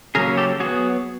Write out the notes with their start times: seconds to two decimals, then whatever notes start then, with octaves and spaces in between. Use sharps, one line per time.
0.15 C#3 F#3 A#3 C#4 G#4 A#4
0.37 G4 A4
0.60 F#3 B3 F#4 G#4